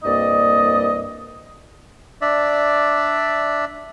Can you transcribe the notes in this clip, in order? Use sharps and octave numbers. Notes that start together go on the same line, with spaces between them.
C2 G2 A#3 D5 D#5
D4 D5 E5